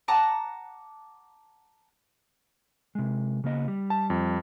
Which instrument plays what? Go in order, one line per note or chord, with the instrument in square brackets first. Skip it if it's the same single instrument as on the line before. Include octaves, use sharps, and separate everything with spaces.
[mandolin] F#5 A5 A#5 D6
[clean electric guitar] C3 G#3
C#3 A#3 D#5
G3
[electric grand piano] A5
F2